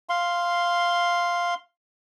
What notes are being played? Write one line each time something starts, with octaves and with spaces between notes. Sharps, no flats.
F5 C6